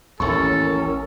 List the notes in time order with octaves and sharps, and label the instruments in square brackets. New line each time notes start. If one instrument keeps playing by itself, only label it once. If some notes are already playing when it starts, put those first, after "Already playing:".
[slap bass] A1 D#2 [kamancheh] C#4 A#4 [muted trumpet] A4 [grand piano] C#6